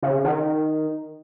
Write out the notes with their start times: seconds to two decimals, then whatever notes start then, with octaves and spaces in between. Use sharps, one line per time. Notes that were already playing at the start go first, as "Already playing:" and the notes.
0.03 C#3
0.24 D#3